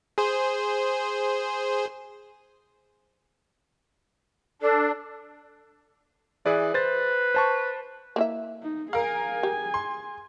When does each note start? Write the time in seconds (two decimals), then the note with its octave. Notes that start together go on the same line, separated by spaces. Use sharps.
0.18 G#4 C5
4.62 D4 A4
6.46 E3 G#4 B4 D5
6.74 B4 C5 A6
7.34 C5 A5 C#6
8.16 A#3 E4 E5
8.63 D#4
8.93 G#4 A#4 F5 G#5
9.43 G4
9.74 C6